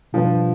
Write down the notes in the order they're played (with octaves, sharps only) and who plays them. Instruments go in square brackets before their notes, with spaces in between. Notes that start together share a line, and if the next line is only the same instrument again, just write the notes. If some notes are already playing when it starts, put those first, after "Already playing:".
[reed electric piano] B2 G3 D4 F4 B4 [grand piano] F3